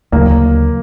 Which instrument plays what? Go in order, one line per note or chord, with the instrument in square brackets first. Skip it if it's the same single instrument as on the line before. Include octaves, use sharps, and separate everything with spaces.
[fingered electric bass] D2 C#3 F#3 [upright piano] A#3